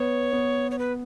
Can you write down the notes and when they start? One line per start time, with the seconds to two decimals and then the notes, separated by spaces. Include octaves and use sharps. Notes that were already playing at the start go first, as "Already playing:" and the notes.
Already playing: B3 C#5
0.33 B3
0.71 C#5
0.79 B4